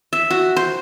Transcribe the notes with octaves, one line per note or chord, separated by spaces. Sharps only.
E5
F#4
C5